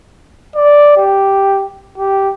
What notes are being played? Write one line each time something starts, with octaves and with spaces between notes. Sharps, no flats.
D5
G4
G4